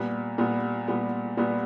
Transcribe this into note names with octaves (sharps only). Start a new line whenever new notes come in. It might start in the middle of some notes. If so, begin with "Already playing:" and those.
Already playing: A#2 G3 B3
A#2 G3 B3
A#2 G3 B3
A#2 G3 B3